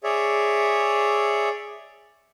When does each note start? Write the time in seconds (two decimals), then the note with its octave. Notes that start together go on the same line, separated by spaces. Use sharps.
0.03 G#4 C#5 D5 E5